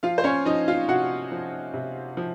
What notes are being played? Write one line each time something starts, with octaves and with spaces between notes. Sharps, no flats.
F3 F4 F5
C5
C#4 C#5
F3 D#4 D#5
F4 F5
C3 F#4 F#5
F3
C3
F3